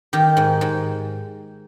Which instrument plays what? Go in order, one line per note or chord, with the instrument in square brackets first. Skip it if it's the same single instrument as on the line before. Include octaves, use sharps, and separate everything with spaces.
[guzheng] D#3 G4
G#2
G#2